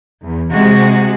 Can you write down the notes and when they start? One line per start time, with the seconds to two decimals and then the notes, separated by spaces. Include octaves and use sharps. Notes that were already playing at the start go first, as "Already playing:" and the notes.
0.22 E2
0.52 C3 G#3 F#4